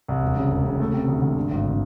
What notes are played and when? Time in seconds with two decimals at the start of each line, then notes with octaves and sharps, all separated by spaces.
0.08 C2
0.22 E1
0.37 C#3
0.51 E1
0.65 C#3
0.80 A3
0.94 C3
1.08 D2
1.22 D2
1.37 G2
1.51 G#1
1.65 D3